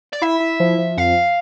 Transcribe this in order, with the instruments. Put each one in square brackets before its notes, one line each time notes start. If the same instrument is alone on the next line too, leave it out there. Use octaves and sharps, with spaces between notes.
[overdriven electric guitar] D5
[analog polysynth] E4 [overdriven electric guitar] E5
[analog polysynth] E4
F3
F3
[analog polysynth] F2 [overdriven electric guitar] F5